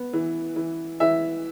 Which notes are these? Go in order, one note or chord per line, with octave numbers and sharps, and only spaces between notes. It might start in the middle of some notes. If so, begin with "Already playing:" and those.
Already playing: B3
E3
E3
E3 E5